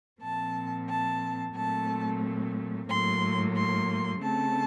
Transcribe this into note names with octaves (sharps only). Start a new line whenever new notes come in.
A#2 F3 C4 A5
A5
A#2 F#3 A3 C4 A5
A2 F#3 A#3 C6
C6
C#3 A3 C4 A5